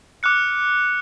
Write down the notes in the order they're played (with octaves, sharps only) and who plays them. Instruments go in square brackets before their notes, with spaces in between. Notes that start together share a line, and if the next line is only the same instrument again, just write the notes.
[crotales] D6 F6 F#6 C#7